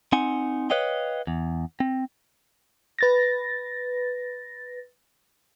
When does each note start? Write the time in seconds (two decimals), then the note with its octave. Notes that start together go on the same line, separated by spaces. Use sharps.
0.12 C4 D#4 F#5 G#5
0.70 B4 C#5 D#5 F5 G5
1.27 E2
1.80 C4
2.99 B4 A6 A#6